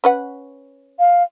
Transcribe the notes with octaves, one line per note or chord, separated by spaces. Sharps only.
C#4 B4 F#5
F5